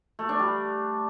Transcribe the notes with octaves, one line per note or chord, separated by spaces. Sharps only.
A3
D4
G3